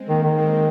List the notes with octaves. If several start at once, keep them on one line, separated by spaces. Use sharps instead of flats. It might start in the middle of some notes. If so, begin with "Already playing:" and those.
Already playing: G#3 C4
D#3 A#3
D#3
G#3 C4